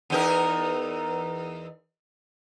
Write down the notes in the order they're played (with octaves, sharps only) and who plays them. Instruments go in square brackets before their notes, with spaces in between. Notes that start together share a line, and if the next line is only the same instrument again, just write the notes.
[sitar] E2 D#4 A#4